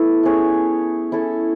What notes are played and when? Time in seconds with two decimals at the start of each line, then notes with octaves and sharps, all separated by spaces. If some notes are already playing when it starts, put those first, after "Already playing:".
Already playing: B3 E4 A4
0.23 A3 C#4 G#4 C#5
1.12 C#4 E4 A4